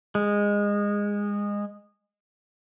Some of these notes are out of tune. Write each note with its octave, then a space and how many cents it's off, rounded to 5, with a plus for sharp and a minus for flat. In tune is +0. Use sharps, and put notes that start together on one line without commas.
G#3 -20